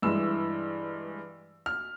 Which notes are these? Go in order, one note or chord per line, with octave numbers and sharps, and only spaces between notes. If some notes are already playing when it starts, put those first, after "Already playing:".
G2 E3 G#3 E6
F6